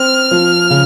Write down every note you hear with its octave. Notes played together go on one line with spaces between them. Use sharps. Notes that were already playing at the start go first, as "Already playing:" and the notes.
Already playing: C4 F6
F3
C#3